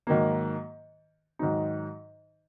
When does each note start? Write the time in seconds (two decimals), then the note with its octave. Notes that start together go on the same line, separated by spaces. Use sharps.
0.07 G#2 D#3 F#3 A#3
1.39 G#2 D#3 F#3 D#4